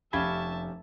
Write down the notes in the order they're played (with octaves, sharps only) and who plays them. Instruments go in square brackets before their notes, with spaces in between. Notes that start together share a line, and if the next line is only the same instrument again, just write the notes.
[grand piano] F1 [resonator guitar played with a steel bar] C#4 G4 F5 [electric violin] E5 A5 [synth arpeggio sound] B5 G#6